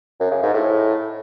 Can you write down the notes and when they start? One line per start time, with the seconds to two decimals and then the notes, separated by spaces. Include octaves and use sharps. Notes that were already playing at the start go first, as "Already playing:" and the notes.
0.20 F#2
0.31 C#3
0.43 G#2
0.54 A2